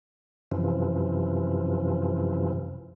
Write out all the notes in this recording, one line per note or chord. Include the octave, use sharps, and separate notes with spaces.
F#2 C3 E3 F3